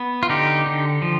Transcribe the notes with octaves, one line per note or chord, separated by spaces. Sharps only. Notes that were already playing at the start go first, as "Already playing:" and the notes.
Already playing: B3
F4
D3 D#4 G4
D3
F3